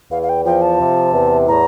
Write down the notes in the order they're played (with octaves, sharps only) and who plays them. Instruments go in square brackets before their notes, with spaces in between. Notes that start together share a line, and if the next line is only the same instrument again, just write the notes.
[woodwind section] E2 [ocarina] F5
[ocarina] F5
G5
[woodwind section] F3 [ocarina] G5
[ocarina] A5
[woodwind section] C3
E2
[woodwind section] A2 [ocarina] A#5